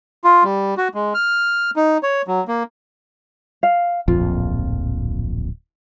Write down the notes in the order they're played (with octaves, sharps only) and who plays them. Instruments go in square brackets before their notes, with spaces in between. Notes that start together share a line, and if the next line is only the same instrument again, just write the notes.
[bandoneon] F4
G3
F#4
G#3
F6
D#4
C#5
F#3
A#3
[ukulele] F5
[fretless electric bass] D1 A#1 F2 [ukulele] F4